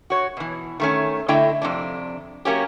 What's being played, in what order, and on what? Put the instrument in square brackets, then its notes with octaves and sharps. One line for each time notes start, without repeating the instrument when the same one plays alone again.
[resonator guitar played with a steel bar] F#4 C#5
B2 E3
D#3 A3 C#4
D3 A3 E4 D#5 G5
F2 C3 D4
F#3 A#3 C#4 G4